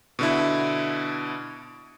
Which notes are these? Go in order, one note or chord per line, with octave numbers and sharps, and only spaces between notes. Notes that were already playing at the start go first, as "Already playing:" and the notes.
B2 D3 E4